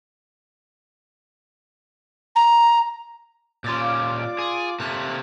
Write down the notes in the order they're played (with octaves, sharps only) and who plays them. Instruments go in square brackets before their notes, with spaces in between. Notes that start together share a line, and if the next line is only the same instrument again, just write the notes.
[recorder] A#5
[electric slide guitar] A#2 C#4 [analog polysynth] F4 D5 D6
[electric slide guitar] G#4
[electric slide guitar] C3 A3 A#3 [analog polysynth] F#6